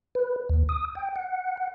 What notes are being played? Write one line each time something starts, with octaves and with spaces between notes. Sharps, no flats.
B4
D#2
D#6
G5
F#5
F#5